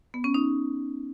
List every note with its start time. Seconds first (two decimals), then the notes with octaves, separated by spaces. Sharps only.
0.14 B3
0.24 C#4
0.34 D#4